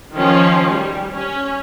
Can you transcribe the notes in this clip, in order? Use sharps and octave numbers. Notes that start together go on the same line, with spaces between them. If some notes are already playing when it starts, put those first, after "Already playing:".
D#3 F3 C#4
G3
C#4